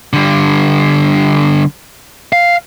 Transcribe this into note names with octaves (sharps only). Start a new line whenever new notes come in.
D3 G3
F5